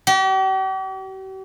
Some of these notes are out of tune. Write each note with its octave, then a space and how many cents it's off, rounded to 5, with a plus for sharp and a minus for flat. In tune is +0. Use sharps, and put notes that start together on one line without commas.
G4 -45